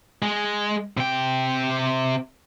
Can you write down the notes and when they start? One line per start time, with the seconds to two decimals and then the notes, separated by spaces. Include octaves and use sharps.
0.22 G#3
0.97 C3 G5